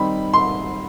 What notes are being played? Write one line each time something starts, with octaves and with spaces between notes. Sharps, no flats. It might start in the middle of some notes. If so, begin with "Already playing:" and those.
Already playing: D#3 G3 C4 D#4 B5
C6